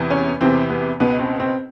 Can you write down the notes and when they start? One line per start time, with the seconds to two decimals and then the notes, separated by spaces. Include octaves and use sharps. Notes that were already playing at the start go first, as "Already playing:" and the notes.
Already playing: E2 C3 E3
0.10 C#4
0.41 E2 C3 E3 C4
0.70 B3
1.00 C#2 B2 B3
1.19 C4
1.40 C4